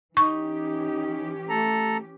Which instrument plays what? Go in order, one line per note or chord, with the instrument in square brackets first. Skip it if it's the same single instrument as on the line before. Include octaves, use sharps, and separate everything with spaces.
[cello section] E3 C#4 G4 [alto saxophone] D#4 [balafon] C#6
[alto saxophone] A3 [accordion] A4 A#5